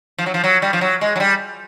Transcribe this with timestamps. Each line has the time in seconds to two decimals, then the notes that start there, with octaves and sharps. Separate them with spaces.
0.18 F3
0.26 F#3
0.34 F3
0.44 F#3
0.62 G3
0.73 F3
0.81 F#3
1.01 G#3
1.16 F#3
1.20 G3